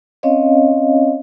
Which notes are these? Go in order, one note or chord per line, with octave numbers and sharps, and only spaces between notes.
C4 C#4 C#5 D#5 F5